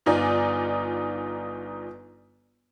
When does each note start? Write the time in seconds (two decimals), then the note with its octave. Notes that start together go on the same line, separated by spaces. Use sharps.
0.06 G1 D#4 F4 D5 G#5